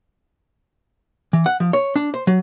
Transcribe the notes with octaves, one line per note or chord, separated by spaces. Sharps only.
E3
F#5
F3
C#5
D4
C5
F#3